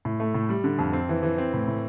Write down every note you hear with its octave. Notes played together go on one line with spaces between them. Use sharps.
A2
A3
A2
G3
D3
F2
C4
E3
E3
C4
A2
A2